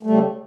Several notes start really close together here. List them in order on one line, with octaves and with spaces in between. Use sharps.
A3 G3 C#3